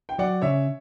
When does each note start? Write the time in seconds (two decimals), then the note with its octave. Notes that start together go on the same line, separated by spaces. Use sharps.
0.09 G5
0.18 F#3 D5 F#5
0.42 C#3 C#5 E5